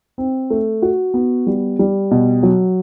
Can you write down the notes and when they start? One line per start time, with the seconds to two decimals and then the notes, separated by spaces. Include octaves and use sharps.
0.18 C4
0.50 A3
0.82 F#4
1.14 B3
1.47 G3
1.79 G3
2.11 B2
2.43 F#3